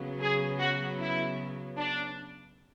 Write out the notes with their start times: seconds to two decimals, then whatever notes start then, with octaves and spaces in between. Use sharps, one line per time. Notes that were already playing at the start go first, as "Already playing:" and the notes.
Already playing: C#3 F#3 B3
0.20 G#4
0.58 F#4
0.99 E4
1.77 D4